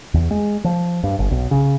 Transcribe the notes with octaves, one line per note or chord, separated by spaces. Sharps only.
E2
G#3
F3
G2
G1
B1
C#3